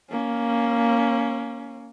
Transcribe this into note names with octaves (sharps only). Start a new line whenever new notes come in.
A#3 C#4